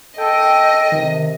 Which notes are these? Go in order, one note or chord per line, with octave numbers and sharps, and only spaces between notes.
A4 D#5 G5
C3 D#3